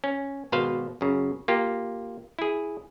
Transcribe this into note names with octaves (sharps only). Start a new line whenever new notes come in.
C#4
G#1 B2 B4 C5 F5
F#2 C#3
A#3 F4 G4
E4 G#4